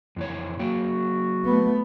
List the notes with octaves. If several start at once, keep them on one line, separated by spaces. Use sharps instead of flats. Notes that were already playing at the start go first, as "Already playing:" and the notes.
F2 E3 C#5
F#3 A#3 F#4 G5
A3 B3